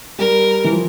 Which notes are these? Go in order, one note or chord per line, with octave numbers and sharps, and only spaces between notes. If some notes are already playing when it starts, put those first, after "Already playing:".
G3 A#4
E3
F3